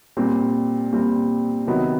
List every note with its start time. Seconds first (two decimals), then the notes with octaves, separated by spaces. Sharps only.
0.17 A#2 G3 C4
0.93 A#2 G3 C4
1.67 C3 D#3 F#3 B3 D#4